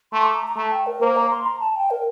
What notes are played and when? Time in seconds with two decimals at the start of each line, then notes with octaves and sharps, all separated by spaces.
0.12 A3 C6
0.23 D6
0.34 A#5
0.46 A#5
0.56 A3 A5
0.72 G5
0.87 A#4
1.01 A#3 C5
1.16 A#5
1.31 C6
1.46 A#5
1.60 A5
1.76 G5
1.91 A#4